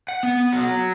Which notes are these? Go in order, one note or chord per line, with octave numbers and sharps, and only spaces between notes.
F#5
B3
F#3